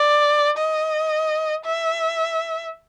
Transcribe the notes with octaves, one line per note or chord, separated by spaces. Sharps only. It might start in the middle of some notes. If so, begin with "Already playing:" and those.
Already playing: D5
D#5
E5